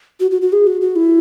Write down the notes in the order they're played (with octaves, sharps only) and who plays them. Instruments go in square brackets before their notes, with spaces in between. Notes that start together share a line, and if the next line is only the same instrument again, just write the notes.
[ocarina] F#4
F#4
F#4
G#4
F#4
F#4
E4